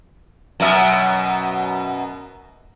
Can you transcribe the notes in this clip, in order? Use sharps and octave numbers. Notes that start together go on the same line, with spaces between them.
F#2 B2 E5